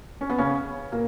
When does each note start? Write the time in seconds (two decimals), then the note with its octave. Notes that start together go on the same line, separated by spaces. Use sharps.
0.21 C#4
0.30 B3
0.38 C#3 C#4
0.92 A#2 A#3